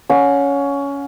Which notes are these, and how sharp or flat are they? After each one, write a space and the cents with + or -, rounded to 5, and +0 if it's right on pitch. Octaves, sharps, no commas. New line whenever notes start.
C#4 +15 F#5 -35